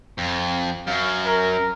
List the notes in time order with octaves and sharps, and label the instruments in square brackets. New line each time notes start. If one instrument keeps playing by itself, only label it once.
[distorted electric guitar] F2
[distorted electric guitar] F#2 [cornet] F5
[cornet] A#4